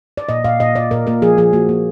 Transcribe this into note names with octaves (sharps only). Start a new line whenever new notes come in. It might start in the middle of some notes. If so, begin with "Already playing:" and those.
D5
A#2 D#5
A#2 F5
A#2 D#5
A#2 D5
A#2 A#4
A#3 A#4
F3 G#4
F3 G#4
A#3 F#4
A#3